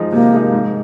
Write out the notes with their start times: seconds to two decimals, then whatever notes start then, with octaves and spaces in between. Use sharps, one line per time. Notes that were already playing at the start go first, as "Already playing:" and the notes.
Already playing: F3 G#3 D#4
0.12 C3 A#3
0.32 F3 G#3 D#4
0.52 G#2